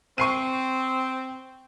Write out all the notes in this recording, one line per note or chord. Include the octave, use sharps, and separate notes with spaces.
C4 C#6 C7 D#7